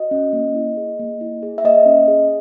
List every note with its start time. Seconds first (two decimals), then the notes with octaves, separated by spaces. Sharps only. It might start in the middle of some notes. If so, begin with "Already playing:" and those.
Already playing: F#4 D#5
0.11 C#4
0.33 A#3
0.55 E4
0.77 G#4
0.99 A#3
1.21 E4
1.43 G#4
1.58 E5
1.64 A#3 D#5
1.86 C#4
2.08 G#4